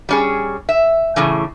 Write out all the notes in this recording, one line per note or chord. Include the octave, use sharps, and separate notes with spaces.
G3 C#4 G#4
E5
A2 C#3 E3